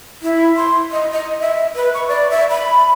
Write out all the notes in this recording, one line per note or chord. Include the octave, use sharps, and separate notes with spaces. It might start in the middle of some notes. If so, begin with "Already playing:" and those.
E4
C6
D#5
D#5
E5
B4
C#6
D5
E5
B5